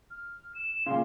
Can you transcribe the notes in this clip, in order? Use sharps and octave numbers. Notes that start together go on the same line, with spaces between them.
F6
E7
E7
A#2 C#3 C6